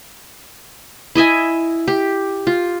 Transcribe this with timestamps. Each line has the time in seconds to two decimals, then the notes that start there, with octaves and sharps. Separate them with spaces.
1.15 E4 D#5 E5 G#5
1.88 G4
2.47 F4